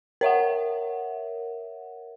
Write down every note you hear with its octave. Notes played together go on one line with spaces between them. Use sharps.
A#4 C#5 E5 F#5